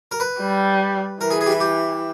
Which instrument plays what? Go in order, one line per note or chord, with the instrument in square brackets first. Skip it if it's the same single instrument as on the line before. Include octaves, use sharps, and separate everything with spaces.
[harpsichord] A#4
B4
[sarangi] G3
[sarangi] E3 [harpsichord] A#4
[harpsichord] G#4
G#4
G4
E4
G4